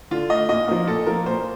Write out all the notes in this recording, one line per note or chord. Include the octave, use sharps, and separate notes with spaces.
D3 F4
A3 D#5
A#2 D#5
F3 A#3 D#5
A#2 A4
F3 A#3 A#4
A#2 C5